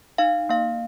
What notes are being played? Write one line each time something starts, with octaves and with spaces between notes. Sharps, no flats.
D#4 F5
A#3 F5